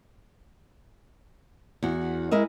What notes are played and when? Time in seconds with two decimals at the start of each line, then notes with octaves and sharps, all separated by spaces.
1.83 E2 F#4
2.31 G#3 E4 A#4 D#5 E5